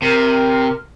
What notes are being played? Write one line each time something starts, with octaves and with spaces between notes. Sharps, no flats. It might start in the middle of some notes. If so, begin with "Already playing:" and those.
C3 A#4